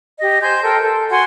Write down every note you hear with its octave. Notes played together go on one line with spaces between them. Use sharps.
G4 D#5
C5 G#5 C6 G6
A4 A#4 G5
A4
F#4 F#5 G#5 C6